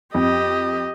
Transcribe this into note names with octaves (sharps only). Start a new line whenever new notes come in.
F2 G4 D#5